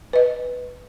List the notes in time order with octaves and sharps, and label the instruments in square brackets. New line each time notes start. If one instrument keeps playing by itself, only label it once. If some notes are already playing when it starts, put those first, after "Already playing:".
[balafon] B4 D#5